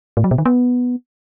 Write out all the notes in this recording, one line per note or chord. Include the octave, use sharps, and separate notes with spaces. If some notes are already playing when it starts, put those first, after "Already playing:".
A2
F#3
B2
D#3
B3